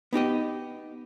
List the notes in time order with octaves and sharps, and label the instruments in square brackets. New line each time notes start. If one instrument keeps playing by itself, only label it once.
[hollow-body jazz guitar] B3 D#4 G4 D#5